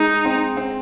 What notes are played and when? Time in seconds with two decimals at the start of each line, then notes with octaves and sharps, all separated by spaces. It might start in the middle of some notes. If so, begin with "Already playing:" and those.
Already playing: G#3 D#4
0.25 C4
0.57 C4